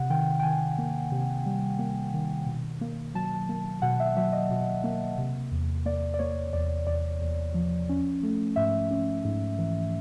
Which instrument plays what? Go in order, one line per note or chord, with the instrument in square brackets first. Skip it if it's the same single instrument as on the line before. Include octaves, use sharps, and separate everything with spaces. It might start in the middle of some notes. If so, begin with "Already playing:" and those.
Already playing: [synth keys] C3 F#5
D#3 G5
G5
D#3 G#5
A#3
C3
G3
A#3
D#3
B2
A#3
F#3 A5
A#3
B2 F#5
E5
F#3 E5
D#5
B2
A#3
C3
E2
A#3 D5
D5
A#3 C#5
E2 D5
E2 D5
E2
F3
C#4
A3
G#2 E5
C#4
G#2
E3